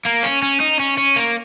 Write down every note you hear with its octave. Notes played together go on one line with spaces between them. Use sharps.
A#3
C#4
C#4
D#4
C#4
C#4
A#3